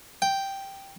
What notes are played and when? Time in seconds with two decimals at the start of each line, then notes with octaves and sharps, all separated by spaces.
0.22 G5